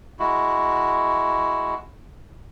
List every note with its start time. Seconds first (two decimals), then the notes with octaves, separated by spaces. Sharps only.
0.20 G#3 E4 F#4